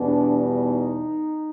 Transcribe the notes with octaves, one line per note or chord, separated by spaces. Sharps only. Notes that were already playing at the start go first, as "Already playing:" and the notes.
Already playing: E2 B2 G3 B3 D4
D#4